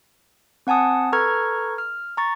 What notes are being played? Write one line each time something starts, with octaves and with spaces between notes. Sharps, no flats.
C4 F#5 G#5 A5 D#6
A4 B4 A#5 C#6 F6 G#6
F6
A#5 C#6 A6